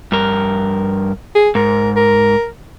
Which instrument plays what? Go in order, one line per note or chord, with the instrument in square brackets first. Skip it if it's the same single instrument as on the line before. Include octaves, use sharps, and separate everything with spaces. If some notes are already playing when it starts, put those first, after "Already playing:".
[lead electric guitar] G2 A#4
[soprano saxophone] G#4
[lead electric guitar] G#2 [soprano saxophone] A#4
[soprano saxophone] A#4